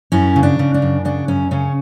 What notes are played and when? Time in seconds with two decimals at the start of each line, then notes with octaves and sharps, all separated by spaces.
0.12 F#2 C#4 E4
0.36 C#3
0.43 D4
0.59 C#3
0.74 D4
0.82 F#2
1.05 C#3 D4
1.28 F#2 C#4
1.51 C#3 C#4